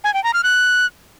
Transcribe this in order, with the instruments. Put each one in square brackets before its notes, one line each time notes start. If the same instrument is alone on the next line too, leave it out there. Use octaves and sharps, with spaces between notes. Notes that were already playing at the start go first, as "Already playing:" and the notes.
[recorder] G#5
G5
A#5
F6
F#6